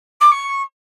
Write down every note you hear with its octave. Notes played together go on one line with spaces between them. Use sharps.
D6
C#6